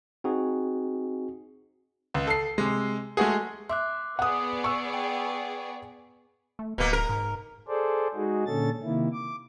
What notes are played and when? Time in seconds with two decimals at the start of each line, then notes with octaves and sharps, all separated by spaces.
0.24 C4 D#4 F#4 G#4
2.14 C#2
2.27 A4 C7
2.58 C3 G#3
3.17 G#3 A3 F#4 G#4
3.69 E5 C6 D6 F#6
4.19 B3 G#4 D5 F#5 D#6
4.64 C#6 E6
4.94 G5
6.59 A3
6.78 D1 B2 A#3
6.93 A#4
7.09 G#2
7.68 G#4 A4 C5 D5
8.15 G#3 D#4 F#4 G#4
8.46 A#2 D3 C#4 A4 A6
8.83 C3 D#3 A#3 E4
9.12 D6